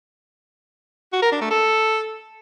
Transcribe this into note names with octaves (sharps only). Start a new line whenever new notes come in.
F#4
A#4
D4
A3
A4